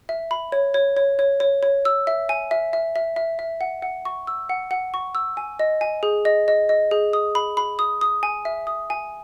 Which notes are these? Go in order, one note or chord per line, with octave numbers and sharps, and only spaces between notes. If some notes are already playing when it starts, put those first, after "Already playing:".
E5
B5
C#5
C#5
C#5
C#5
C#5
C#5
E6
E5
G#5
E5
E5
E5
E5
E5
F#5
F#5
C#6
E6
F#5
F#5
C#6
E6
G#5
D#5
G#5
G#4
D#5
D#5
D#5
G#4
D#6
B5
B5
D#6
D#6
G#5
E5
D#6
G#5